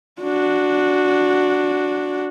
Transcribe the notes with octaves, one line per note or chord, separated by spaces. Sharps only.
D4 F#4